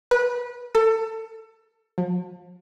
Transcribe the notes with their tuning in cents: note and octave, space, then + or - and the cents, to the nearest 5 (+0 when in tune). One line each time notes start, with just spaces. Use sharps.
B4 -20
A4 +25
F3 +40